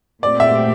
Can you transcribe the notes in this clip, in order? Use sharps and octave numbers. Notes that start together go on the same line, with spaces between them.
A#2 A3 C4 G4 D5
E5